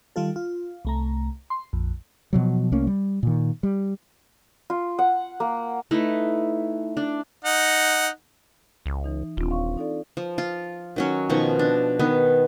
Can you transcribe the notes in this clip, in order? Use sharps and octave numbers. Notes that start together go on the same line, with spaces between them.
D#3 G3 F4 A4
F4
C2 A3 A#5
C6
A#1 F2
B2 F3 F#3
C2 A3 A#3 C#4
G3
A#2 D#3
G3
F4
F#5
A#3
A3 D#4 E4 B4
D4
D#4 F#5
C#2
E3 D#4
D#1 C4 D4 F4
F5 C6 C#6
D#4 A4 D5
F3
F4
D#3 F#3 C#4
B2 D#3 F3 C#6
D4
D#3 B3